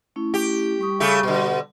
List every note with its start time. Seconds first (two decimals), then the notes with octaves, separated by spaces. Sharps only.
0.16 A3 C#4 E4
0.34 G4
0.79 G3 C#6 D#6
1.00 C#3 A3 G4
1.23 B2 D3